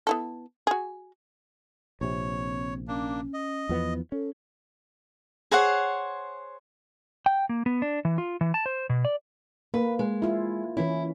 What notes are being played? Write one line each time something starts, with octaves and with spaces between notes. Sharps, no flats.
B3 E4 A4
F#4 G#4
A#1 C3 C4 C#5
A#3 C#4 D4
D#5
E2 F3 B3 E4
C#4 A4
G#4 C5 C#5 F#5
G5
A#3
B3
D4
E3
F4
E3
A5
C5
B2
D5
A#3 B4
G#3
E4 F4
E3 C#4 E4